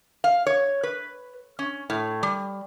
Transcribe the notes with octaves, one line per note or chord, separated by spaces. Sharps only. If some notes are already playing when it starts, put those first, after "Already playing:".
F5
C#5
B4
C#4
A2
G3